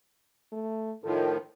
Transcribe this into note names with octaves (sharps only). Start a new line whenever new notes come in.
A3
A2 D#3 F3 A4